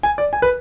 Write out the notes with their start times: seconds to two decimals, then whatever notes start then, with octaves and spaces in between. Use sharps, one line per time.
0.03 G#5
0.18 D5
0.33 G#5
0.42 B4